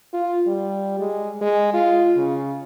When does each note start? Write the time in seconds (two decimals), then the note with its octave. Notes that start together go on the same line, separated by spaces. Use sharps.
0.14 F4
0.47 G3
0.99 G#3
1.41 G#3
1.73 F4
2.16 C#3